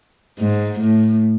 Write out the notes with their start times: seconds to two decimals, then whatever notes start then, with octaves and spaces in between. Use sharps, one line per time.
0.39 G#2
0.80 A2